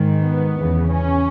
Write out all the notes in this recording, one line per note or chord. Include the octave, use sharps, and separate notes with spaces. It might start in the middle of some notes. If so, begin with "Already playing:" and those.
Already playing: G#2 D#3
B3
E2 C#3 E3
C#4